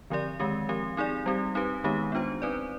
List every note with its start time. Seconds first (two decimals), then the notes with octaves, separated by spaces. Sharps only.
0.10 D3 F3 C4 G4 D5
0.40 D#3 G#3 C4 G4
0.69 F3 C4 G4
0.97 C4 D#4 G#4 D5
1.26 G3 C4 G4
1.55 C4 D#4 G4 B4
1.84 D#3 G#3 B3 D#4 G4
2.12 B3 D4 F4 C5
2.42 C4 D#4 B4 D5